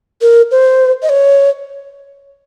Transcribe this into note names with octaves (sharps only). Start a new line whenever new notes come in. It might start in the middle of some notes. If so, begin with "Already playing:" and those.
A#4
C5
D#5
C#5